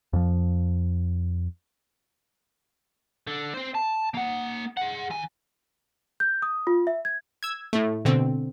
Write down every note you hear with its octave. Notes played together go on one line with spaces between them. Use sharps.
F2 F3
D3
C4 C5
A5
A#3 F#5
G#4 F#5
D#3 G#5
G6
D#6
F4
E5
G#6
E6 G#6
A2 A3
B2 D3 C4